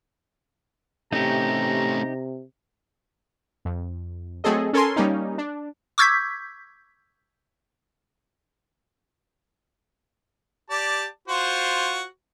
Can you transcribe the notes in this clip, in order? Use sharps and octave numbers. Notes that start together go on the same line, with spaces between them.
C3 A3 C#4 D#4 G4 A#5
F2
F#3 A3 C4 G#4 A4 D#5
C#4 A4 A#4 G#5 C6
G3 A#3 C#4 D#4
D4
C#6 D6 E6 G6 G#6 B6
G4 D5 A5
F4 F#4 C5